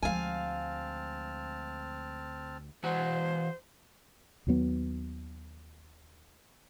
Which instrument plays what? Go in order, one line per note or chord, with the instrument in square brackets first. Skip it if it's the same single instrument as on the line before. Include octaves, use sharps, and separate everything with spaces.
[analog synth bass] D2 [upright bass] F3 G#3 [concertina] C4 A5 F6 [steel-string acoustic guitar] F5 G#5
[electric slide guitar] E3 F#4 F#5 [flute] C5
[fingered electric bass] D#2 D#3 F#3 B3